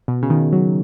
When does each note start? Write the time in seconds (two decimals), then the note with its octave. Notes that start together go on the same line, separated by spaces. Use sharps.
0.08 B2
0.23 C#3
0.30 D#3
0.53 F#3